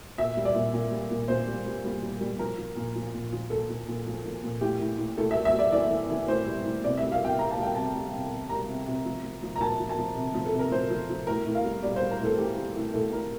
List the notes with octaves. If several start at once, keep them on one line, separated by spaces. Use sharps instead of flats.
A#2 E5
G3
D5
A#2
A#2
G3
A#2
A#2 C5
G3
G3
G3
G3
G3
F3 A#4
F3
A#2
F3
A#2
F3
F3 A4
A#2
A#2
F3
F3
A#2
A2 G4
A2
A2
A2 A4
E5
G3
E5
G3
D5
E3 D5
E3
E3
A2 C5
G3
A2
C3 D5
G3 E5
F5
C3 G5
G3 A#5
A5
G3 G5
C3 A5
G3
C3
C3
G3 A#5
C3
C3
F3
F3
F3
A#5
F3 A5
F3
A5
F3
C3
F3
A4
C3
A#4
F3 C5
F3
F3
A2 A#4
A2
F5
G3
G3 D5
G3 C5
A#4
A2 A4
E3 G4
G3
A2
A2 A4
A2 A#4